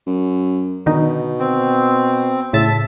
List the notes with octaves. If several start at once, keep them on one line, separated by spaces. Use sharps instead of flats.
F#2
B2 D3 D#3 D#4
C4
A2 C#3 E5 A5